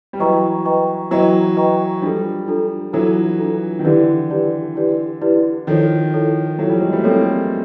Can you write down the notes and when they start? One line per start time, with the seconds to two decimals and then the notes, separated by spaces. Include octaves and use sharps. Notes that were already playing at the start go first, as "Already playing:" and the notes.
0.13 G3
0.19 E3 F#3 B4 D#5 G5 A#5 C#6
0.65 B4 D#5 G5 A#5 C#6
1.11 E3 F#3 B4 D#5 G5 A#5 C#6
1.57 B4 D#5 G5 A#5 C#6
2.02 F3 G3 D4 F4 A4
2.48 D4 F4 A4
2.93 E3 F#3 D4 F4 A4
3.39 D4 F4 A4
3.79 D#3
3.84 D3 E3 E4 G4 B4 D5
4.30 E4 G4 B4 D5
4.75 E4 G4 B4 D5
5.22 E4 G4 B4 D5
5.67 D#3 F3 E4 A4 C#5
6.13 E4 A4 C#5
6.59 E3 F#3 E4 A4 C#5
6.70 F3 G3
6.81 F#3 G#3
6.93 G3 A3
7.03 A#3 C4 E4 A4 C#5